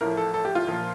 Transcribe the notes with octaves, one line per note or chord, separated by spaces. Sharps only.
A1 A2 F3 A#4
A4
A4
G4
F4
A#1 A#2 F3